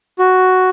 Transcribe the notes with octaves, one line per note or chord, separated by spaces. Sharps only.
F#4